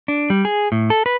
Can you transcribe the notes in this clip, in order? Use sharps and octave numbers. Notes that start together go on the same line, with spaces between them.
D4
G3
G#4
A2
A4
B4